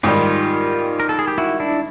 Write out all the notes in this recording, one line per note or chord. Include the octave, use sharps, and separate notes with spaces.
G#2 D#3 G3 F4 G4
A#4
A4
G#4
G4
E4 F#4
D4 E4